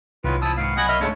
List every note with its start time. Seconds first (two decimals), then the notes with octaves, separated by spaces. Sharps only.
0.24 C2 D#3 F#3 G#3 F4 B4
0.42 E2 F3 E4 A5 D#6 E6
0.57 G#2 D#3 B3 F5
0.77 B2 F#3 D#5 F#5 G#5 B5
0.89 A#3 D#5 E5 F6
1.01 D2 G#2 C#3 G#3 A3 C#5